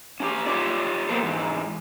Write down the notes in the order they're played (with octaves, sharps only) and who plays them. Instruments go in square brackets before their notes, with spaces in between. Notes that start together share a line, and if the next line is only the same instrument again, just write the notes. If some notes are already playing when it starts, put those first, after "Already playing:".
[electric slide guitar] C#4 F#4 G4
F4 G4 C#5 D5
A#3 B3 A4 C5
G#2 E3